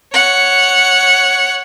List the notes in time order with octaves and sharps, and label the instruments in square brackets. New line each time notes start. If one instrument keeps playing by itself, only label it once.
[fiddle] C#5 F#5